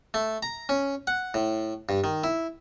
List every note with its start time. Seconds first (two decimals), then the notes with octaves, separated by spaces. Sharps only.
0.14 A3
0.43 A#5
0.69 C#4
1.07 F#5
1.34 A2
1.89 G2
2.04 D#3
2.24 E4